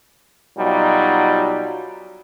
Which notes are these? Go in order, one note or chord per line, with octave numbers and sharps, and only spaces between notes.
B2 F#3 G3 D#4 F4